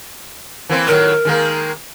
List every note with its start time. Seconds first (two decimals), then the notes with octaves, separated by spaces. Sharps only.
0.69 E3 A#3 C4
0.87 A2 D#3 F#3 A#4
1.25 D#3 G#3 A#3